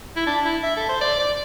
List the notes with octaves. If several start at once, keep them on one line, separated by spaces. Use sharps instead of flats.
E4
D4
E4
E5
A4
C5
D5
D5